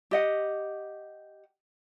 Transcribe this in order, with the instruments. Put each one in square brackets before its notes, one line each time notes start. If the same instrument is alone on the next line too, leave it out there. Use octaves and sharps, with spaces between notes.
[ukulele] G4 D#5 F#5